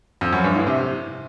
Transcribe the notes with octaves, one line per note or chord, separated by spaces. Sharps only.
F2
F#2
G2
A2
C3